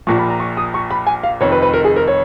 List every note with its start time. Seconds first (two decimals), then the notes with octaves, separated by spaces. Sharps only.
0.07 A#1 A#2 F3 C#6
0.18 B5
0.29 A#5
0.40 C#6
0.57 D#6
0.74 C#6
0.91 B5
1.07 G#5
1.23 F5
1.41 F1 F2 D#3 C#5
1.52 B4
1.62 B4
1.74 A#4
1.84 G#4
1.96 A#4
2.08 C#5